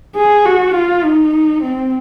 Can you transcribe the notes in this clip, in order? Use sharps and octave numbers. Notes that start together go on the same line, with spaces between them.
G#4
F#4
F4
D#4
C4